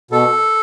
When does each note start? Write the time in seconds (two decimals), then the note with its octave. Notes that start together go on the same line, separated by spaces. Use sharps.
0.11 B2 A4